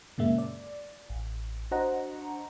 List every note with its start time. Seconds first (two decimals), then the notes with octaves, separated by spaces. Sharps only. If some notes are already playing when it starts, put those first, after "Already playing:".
0.18 F#2 A#2 C#3 G#3 A#3 E5
0.38 D5
1.09 A1
1.71 D4 F#4 C5 D#5 F#5 A#5